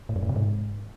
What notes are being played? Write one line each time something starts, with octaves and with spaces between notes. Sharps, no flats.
A2
F#2
A2
C3
G#2